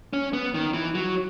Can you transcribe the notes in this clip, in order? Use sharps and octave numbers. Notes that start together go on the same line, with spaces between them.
C#4
B3
D#3
E3
F#3